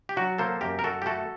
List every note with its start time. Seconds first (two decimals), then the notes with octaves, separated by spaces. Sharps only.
0.09 G4
0.16 F#3 D4 F#4
0.38 A#3 A4 C5
0.61 F#2 G4 A#4
0.79 A#4
0.84 F#2 F#4 A4
1.02 G4
1.06 A3 F#4 A4